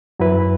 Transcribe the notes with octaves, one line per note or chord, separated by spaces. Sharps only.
F#2 F#3 E4 B4